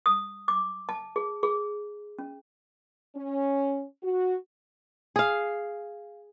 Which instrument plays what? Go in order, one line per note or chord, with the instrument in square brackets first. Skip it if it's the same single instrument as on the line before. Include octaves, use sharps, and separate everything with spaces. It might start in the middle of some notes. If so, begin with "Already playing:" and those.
[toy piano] D#6
D6
A5
G#4
G#4
C#4
[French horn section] C#4
F#4
[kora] G#4 F5